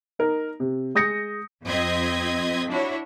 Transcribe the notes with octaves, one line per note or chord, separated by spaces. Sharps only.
D#4 A#4
C3
G#3 D#6 G6 A#6 C#7
F2 C4 D#5 G#6 B6
D4 E4 F#4 C#5